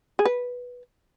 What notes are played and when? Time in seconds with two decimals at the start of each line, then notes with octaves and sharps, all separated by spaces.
0.19 G#4
0.25 B4